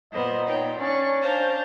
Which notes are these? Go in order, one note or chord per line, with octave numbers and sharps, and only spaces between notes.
A#2 B3 C5 D#5
D#4 C#5 G5
C#4 D4 D5 C#6
D4 C5 F5 A5 A#5 G6